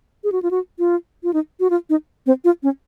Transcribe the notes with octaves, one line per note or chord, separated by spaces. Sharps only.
G#4
F#4
F4
F#4
F4
F4
D#4
F#4
F4
D#4
C4
F4
C#4